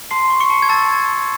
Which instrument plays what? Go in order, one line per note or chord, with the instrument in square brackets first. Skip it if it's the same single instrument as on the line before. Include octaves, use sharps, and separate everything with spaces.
[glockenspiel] A5 C6 C7
C#6
C#6 C#7
A5
G#6
A5 E6 A6